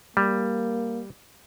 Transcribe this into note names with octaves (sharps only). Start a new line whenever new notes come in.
G3 A#3